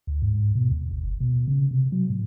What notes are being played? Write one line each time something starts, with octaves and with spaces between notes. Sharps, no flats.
D2
G#2
B2
D#2
G#1
F#1
B2
C#3
C3
F#3
A2